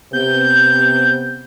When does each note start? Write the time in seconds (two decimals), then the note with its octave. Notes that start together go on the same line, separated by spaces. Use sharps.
0.13 C3 B3 G6